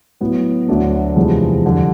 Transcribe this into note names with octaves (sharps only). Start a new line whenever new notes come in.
A2 F#3 B3
D2 D3 F#3 A3 D4
E2 C3 F3 G#3
F2 D3 G3